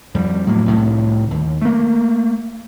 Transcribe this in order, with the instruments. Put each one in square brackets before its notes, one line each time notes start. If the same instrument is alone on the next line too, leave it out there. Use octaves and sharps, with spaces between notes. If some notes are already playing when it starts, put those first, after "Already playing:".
[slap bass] F2 G3
A2 F#3 G3 A#3
C2 A2
D#2
A3 A#3